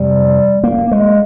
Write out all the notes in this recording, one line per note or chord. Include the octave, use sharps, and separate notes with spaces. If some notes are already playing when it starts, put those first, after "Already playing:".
Already playing: F2 C3 G3
A#3
G#3